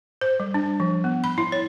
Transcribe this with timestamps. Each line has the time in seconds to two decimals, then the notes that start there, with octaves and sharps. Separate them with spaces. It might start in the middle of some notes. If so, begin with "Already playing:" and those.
0.21 C5
0.40 G3
0.54 D4
0.80 F3
1.04 B3
1.24 B5
1.38 E4
1.52 C#5